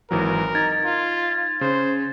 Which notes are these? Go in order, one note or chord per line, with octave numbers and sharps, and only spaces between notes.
G#1 E3 F#3 A#4
D#4 G#6 A6
F4
C#3 C5